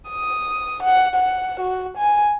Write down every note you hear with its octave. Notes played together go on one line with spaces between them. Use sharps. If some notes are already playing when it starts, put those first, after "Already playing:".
D#6
F#5
F#5
F#4
G#5